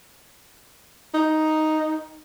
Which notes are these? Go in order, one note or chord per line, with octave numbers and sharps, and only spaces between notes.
D#4